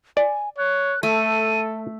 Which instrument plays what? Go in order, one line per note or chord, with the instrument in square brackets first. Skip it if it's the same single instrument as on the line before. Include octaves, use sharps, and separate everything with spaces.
[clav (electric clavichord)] D5 [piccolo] G#5
[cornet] C#5 [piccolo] F#6
[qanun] A3 [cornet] A4 [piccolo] D#7